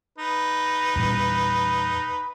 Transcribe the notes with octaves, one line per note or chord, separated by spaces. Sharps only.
D#4 B4
E2 A#2 G3